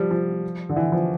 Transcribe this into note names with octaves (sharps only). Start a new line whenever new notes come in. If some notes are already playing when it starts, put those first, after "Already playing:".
Already playing: F3 G3
F3
D3
E3
F3